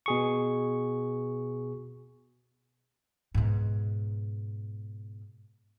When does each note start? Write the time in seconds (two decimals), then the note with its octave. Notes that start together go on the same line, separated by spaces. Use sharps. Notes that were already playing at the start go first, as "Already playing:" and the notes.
0.06 B2 G#4 C#6
3.34 G#2 B2